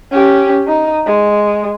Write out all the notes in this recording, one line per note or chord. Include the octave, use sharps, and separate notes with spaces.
C#4 G4
D#4
G#3